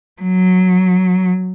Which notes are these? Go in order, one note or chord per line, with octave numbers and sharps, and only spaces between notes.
F#3